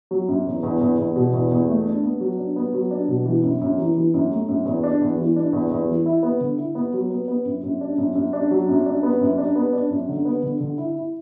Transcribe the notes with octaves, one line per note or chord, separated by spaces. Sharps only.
F#3
F#2
E2
E2
E2
E2
B2
E2
E2
A3
D4
B3
F#3
D4
B3
F#3
D4
B2
E3
F#2
F#2
E3
E3
F#2
A3
F#2
E2
D4
E2
E3
D4
E2
E2
E3
E4
B3
D3
E4
B3
F#3
B3
B3
F#2
F#2
D4
F#2
F#2
D4
F#3
F#2
D4
B3
F#2
D4
B3
D4
F#2
D3
B3
D3
D3
E4
E4